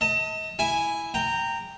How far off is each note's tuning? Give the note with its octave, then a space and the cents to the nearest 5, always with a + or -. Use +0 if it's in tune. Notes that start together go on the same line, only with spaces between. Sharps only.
D#5 +40 A5 +35
E4 +0 G#5 +0
G5 +0 A#5 -15